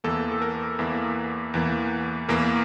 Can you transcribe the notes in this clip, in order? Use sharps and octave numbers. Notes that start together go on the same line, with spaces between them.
E2 E3 A#3 A4
A4
A#4
E2 E3 A#3
E2 E3 A#3
E2 E3 A#3 A#4